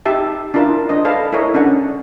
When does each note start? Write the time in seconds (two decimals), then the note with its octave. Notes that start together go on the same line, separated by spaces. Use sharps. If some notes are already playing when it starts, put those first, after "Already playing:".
0.06 D#4 G4 E5 A5
0.54 D4 E4 F4 A#4 A5
0.89 D4 C5 D#5
1.05 A4 B4 D5 F5 A5
1.33 E4 A4 A#4 C#5 D#5
1.54 C#4 D4 A4 F#5